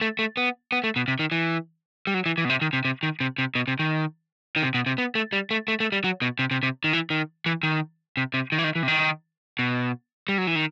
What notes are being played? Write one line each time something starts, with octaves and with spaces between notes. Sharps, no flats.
A3
A3
B3
B3
A3
B2
C3
D#3
E3
G3
F#3
E3
E3
B2
C3
D#3
C3
C3
D#3
C3
C3
B2
C3
D#3
D#3
C3
B2
C3
B3
A3
G3
A3
A3
A3
G3
F#3
B2
C3
C3
C3
D#3
E3
D#3
E3
D#3
C3
C3
D#3
E3
D#3
E3
C3
D#3
B2
G3
F#3
E3
D#3